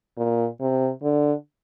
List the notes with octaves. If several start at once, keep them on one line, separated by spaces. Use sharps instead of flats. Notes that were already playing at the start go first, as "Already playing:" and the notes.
A#2
C3
D3